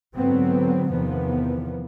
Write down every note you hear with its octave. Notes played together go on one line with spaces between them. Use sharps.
G#2 D3 F#3 B3 C4
E2 C3 D#3 F3 B3